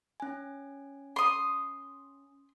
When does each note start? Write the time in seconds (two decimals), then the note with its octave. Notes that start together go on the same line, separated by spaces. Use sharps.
0.20 C#4 G#5
1.16 C6 D#6